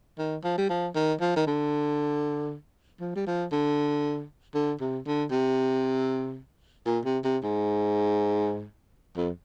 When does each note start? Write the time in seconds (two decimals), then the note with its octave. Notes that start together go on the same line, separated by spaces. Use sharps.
0.18 D#3
0.44 F3
0.58 G3
0.70 F3
0.95 D#3
1.21 F3
1.36 D#3
1.47 D3
3.01 F3
3.16 G3
3.27 F3
3.52 D3
4.55 D3
4.80 C3
5.06 D3
5.31 C3
6.86 A#2
7.05 C3
7.24 C3
7.44 G#2
9.17 F2